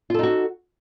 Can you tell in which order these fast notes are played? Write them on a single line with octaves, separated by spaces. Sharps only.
F4 A4 D#4 F#4